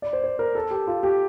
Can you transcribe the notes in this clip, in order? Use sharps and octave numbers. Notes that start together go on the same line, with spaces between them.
D5
C5
C5
A#4
A4
G4
F4
G4